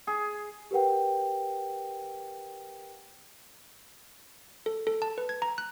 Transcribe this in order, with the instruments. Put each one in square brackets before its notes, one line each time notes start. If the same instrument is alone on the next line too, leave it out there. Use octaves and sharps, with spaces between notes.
[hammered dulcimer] G#4
[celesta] G4 A#4 B4 F#5 G5
[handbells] A4
A4
A5
B4
G#6
A#5
F#6